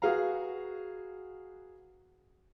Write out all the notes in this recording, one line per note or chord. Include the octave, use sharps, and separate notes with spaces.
F#4 G#4 B4 F5 A#5